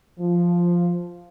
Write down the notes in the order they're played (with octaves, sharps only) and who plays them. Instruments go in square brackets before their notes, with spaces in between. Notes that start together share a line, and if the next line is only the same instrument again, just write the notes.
[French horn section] F3